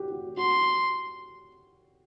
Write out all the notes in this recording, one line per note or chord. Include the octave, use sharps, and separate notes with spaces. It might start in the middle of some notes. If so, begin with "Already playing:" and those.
Already playing: F#4 G4
F#4
F#4 C6